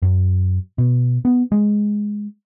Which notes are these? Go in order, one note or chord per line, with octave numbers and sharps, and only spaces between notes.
F#2
B2
B3
G#3